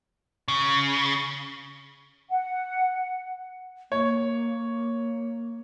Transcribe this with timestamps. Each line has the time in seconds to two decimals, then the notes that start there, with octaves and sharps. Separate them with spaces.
0.48 C#3
2.29 F#5
3.92 A#3 C#5